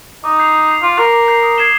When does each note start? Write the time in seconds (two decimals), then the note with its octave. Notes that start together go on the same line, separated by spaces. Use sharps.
0.24 D#4 D6
0.39 G6 C7 F7
0.54 D6
0.69 G6 C7 F7
0.82 F4 D6
0.98 A#4 G6 C7 F7
1.13 D6
1.28 G6 C7 F7
1.43 D#6
1.58 G#6 C7 E7 G7